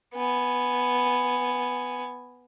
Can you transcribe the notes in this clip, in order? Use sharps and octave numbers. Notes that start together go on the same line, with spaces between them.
B3 G#5